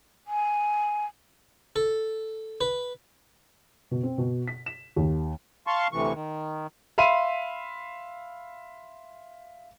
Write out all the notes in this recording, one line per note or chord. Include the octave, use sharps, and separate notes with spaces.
G#5
A4
B4
B2
C4
B2
B6
E7
D#2
F5 A5 C6 C#6
D2 A2 C3 E3 C#6
D#3
E5 F5 B5 C6 D#7